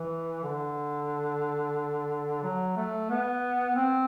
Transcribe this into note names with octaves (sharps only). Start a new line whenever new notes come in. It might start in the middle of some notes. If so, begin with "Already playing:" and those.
Already playing: E3
D3
F#3
A3
B3
C4